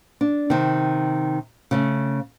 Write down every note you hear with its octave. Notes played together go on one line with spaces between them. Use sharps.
D4
C3 D#3
C#3 A3 C#4